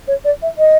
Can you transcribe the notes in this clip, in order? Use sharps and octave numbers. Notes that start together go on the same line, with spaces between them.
C#5
D5
E5
D#5